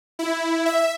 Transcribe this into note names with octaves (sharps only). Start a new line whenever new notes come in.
E4
E5